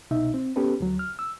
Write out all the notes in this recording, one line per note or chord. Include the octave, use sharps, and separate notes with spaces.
C2 B2 D#4 E5
C4
B3 C#4 G4 A4 B4
D2 F#3
F6
E6